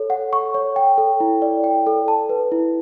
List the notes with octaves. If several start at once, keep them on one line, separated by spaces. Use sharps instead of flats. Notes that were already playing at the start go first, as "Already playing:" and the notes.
Already playing: A4 C#5
F#5
C#6
C#5
G5
A4
E4
D5
G5
A4
A5
B4
E4